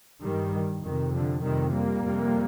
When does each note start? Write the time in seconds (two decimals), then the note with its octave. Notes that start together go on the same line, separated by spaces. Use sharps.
0.22 G2 D#3 G3
0.83 F2 C3 D#3
1.12 D3 F3
1.42 F2 C3 D#3 G3
1.72 G3 A#3
2.02 F2 C3